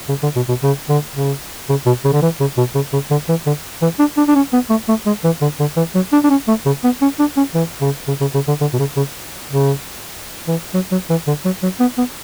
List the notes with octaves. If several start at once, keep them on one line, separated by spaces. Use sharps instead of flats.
C#3
D3
B2
B2
C#3
D3
C#3
C#3
B2
C#3
D3
E3
C#3
B2
C#3
C#3
D3
E3
D3
E3
D4
D4
D4
C#4
B3
A3
A3
G#3
E3
D3
D3
E3
F#3
D4
D4
C#4
A3
C#3
B3
C#4
D4
C#4
E3
C#3
C#3
C#3
C#3
D3
D3
B2
C#3
C#3
C#3
E3
F#3
F#3
E3
D3
F#3
F#3
B3
B3